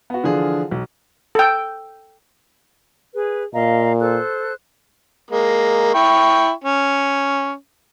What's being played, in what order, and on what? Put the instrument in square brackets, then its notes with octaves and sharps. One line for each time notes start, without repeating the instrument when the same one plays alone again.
[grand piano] B3 F#4
D3 E3 F3 D4 F4 G#4
B1
[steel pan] A4 G5
[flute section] G#4 B4
[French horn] A#2 [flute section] D#5 F5 A#5
[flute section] A4 C5 F#6
[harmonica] G#3 A#3
E4 G5 C#6
C#4